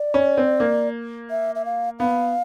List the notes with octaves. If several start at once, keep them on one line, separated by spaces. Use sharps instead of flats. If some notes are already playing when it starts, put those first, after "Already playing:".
Already playing: D5
C#4
C4
A#3
E5
E5
F5
B3 F5